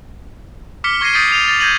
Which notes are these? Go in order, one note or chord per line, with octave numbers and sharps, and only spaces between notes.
D6 F6 B6 C#7 G7
C#6 G#6 A#6 C7 D#7
D#6 G6 A6 B6 C7 D7
D#7 F7
A6
G6 G#6 A#6 D#7 F#7